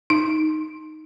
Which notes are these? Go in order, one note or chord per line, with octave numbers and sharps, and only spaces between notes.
D#4